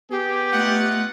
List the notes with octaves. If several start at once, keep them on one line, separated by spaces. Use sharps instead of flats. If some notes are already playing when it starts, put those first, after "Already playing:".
B3 G4 G#4
A3 D#4 F4 F#5